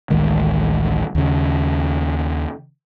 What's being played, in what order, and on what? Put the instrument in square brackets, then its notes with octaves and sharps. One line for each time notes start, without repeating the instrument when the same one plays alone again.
[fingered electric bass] A1 D2 D#3 G#3
D#2 C#3